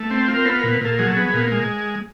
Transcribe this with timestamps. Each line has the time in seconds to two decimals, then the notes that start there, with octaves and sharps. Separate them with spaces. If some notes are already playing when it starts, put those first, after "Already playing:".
Already playing: A3
0.11 C4
0.28 F4
0.34 A#4
0.45 B3 A4
0.59 A#4
0.64 A#2
0.73 B4
0.81 A#2 A4
0.99 F#3 G#4
1.06 A4
1.13 B3 G#4
1.34 A#2
1.52 G#3